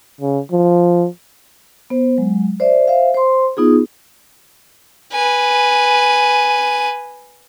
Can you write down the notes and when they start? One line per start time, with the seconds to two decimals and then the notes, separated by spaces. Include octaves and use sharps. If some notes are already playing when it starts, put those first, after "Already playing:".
0.21 C#3
0.52 F3
1.90 B3 C5
2.18 F#3 G#3
2.60 C5 D5 E5
2.88 C5 E5 F5
3.14 C5 C6
3.57 B3 D#4 F4 G#4
5.12 B4 G#5